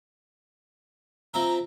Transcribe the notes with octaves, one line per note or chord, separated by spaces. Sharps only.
F3 C4 E5 A#5